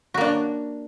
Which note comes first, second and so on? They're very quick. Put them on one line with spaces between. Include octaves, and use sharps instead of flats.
F#4 A#3 D4